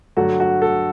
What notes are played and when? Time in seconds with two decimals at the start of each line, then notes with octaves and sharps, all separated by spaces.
0.17 G2 D3 F#3 A3 F#4
0.40 F#4
0.62 A4